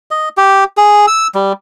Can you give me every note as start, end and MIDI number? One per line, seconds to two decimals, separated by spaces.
0.11 0.29 75
0.37 0.64 67
0.77 1.06 68
1.07 1.27 88
1.35 1.53 55